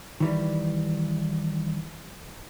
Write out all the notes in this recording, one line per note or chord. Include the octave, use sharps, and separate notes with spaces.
D#3 E3 G3